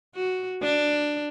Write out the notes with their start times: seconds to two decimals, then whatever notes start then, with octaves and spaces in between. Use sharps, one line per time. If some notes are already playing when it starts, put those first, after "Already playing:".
0.15 F#4
0.62 D4